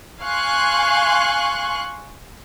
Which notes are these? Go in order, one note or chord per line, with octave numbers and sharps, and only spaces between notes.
F5 G#5 C6 C#6 F#6